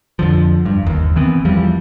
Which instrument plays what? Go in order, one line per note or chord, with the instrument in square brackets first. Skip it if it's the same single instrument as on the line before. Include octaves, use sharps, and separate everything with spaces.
[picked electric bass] F2 D3 F3
G2
G1 D#2
D#3 E3 B3 C4
E2 E3 F3 G3